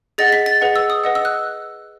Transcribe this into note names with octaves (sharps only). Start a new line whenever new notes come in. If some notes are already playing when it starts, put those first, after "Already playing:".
G#4 D#5 F#5 A6
B6
A6
G#4 B4 D#5 F#5
E6
D#6
B4 D#5 F#5
E6
F#6